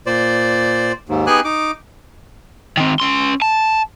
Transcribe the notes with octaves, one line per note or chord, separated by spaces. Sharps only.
A#2 C5 D5
D#2 G#2
B3 D#4 G4 G#4 G#5 F#6
D#4 D6
D#3 C4
C#4 C6
A5